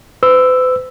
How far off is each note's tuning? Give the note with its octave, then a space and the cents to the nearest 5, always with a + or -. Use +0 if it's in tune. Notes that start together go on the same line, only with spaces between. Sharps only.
B4 +45 E6 +0